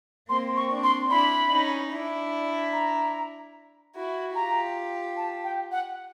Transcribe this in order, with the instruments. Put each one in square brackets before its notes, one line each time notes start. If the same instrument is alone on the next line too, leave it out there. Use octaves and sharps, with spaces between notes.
[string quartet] A#3 C4 [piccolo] C6
[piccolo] C#6
[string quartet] C4 D4
[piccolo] C6
[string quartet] D4 E4 [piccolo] B5
[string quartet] C#4 D#4
D4 E4
[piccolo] A#5
[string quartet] E4 F#4
[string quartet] F4 G4 [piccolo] A#5
[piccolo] A5
G5
F#5